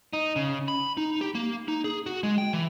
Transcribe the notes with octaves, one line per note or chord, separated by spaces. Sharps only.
D#4
C#3
B5
D#4
G4
A#3
D#4
G#4
F#4
G#3
G5
E3